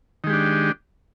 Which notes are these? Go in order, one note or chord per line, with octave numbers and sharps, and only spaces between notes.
D#3 G#3 D4 G4